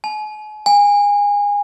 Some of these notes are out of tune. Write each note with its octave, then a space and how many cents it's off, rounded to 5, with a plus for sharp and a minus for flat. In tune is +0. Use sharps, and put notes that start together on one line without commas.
G#5 +45
G#5 -25